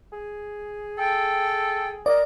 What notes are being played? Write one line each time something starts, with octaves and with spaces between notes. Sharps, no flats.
G#4
A4 G5
A#4 D5 D#5